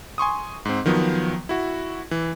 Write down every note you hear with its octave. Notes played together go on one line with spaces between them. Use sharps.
G#5 C6 C#6 D#6
G#2 C4
D#3 F3 F#3 B3
E4 F#4
E3